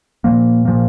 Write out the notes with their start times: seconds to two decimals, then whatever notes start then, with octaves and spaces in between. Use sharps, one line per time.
0.24 A#2 F3 A#3
0.65 A#2 F3 A#3